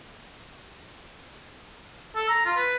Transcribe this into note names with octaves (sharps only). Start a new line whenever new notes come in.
A4
A#5
F4
B4